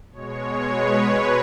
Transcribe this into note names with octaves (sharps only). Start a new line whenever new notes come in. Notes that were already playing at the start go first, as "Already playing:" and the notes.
B2 G#3 C#5
B4